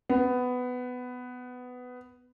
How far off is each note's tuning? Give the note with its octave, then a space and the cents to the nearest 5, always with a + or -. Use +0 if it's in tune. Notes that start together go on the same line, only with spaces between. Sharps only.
B3 +15